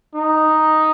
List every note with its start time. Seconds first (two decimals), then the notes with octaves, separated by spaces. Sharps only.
0.15 D#4